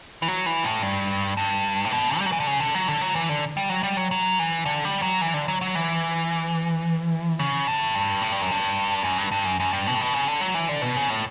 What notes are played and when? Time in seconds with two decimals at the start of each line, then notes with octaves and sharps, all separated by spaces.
0.22 E3
0.28 F#3
0.46 E3
0.64 A2
0.82 G2
1.37 G2
1.85 A2
1.91 B2
2.18 G3
2.26 F#3
2.32 E3
2.40 D3
2.47 C#3
2.60 D3
2.75 F#3
2.88 D3
3.01 F#3
3.15 E3
3.29 D3
3.57 G3
3.69 F#3
3.83 G3
3.97 F#3
4.11 F#3
4.39 E3
4.66 D3
4.85 G3
5.02 F#3
5.21 E3
5.34 D3
5.48 F#3
5.61 F#3
5.75 E3
7.39 C#3
7.67 A2
7.95 G2
8.22 A2
8.32 G2
8.42 F#2
8.51 G2
9.04 F#2
9.18 G2
9.32 G2
9.45 F#2
9.60 F#2
9.73 G2
9.87 B2
9.95 A2
10.01 B2
10.14 C#3
10.27 D3
10.41 F#3
10.55 E3
10.69 D3
10.82 B2
10.97 C#3
11.10 A2